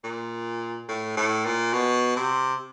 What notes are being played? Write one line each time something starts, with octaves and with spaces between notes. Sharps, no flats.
A#2
A2
A2
A#2
B2
C3